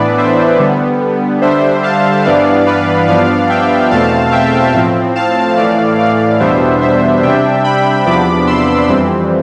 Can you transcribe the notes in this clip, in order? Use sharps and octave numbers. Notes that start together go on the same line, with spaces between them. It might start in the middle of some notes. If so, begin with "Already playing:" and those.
Already playing: A2 E3 B3 D4 B4 D5
C5 E5
D3 G3 B3
D3 G3 D4 C5 E5
F5 A5
G2 E3 B3 D4 D5 F5
B4 D5
G2 F3 B3 D4 D5 F5
E5 G5
E2 B2 A3 C4 F5 A5
E5 G5
A2 F3 C4
F5 A5
A2 E3 A3 D5 F5
D5 F5
E2 B2 G3 B3 D4 C5 E5
C5 E5
C3 G3 D4 E5 G5
G5 B5
E2 C3 F3 B3 D4 B5 D6
C6 E6
F2 E3 G3 C4